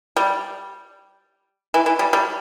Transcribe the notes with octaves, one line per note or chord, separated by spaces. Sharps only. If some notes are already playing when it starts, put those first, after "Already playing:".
G3
E3
E3
G3
G3